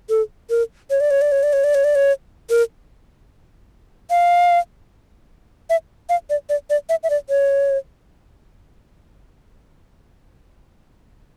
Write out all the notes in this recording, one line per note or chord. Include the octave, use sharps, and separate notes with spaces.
A4
A#4
C#5
D5
C#5
D5
C#5
D5
C#5
D5
C#5
D5
C#5
A#4
F5
E5
F5
D5
D5
D5
E5
E5
D5
C#5